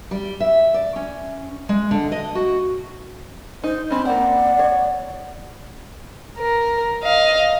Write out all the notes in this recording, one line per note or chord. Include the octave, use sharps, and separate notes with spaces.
G3
E5
D5
C#4
G#3
D3
D#5
F#4
D#4 C5
C4 C#4 B5
A#3 C4 D5 F#5
C#5
A#4
D#5 F5